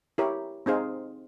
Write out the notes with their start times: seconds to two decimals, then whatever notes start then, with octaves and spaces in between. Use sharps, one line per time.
0.18 E4 G4 A#4 C#5
0.66 C4 D#4 G#4 C5 F5